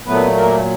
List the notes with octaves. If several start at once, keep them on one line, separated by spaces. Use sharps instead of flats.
A#2 F#3 A3 B3 B4
A#3 A#4